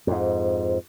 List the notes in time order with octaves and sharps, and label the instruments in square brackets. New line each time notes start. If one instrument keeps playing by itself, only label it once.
[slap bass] F2 G#2